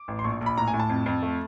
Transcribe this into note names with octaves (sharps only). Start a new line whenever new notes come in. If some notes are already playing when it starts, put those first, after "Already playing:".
Already playing: D6
A1
C6
A#1 C#6
A#1
B5
A2 A#5
G#5
A2
A5
F2
F2
A3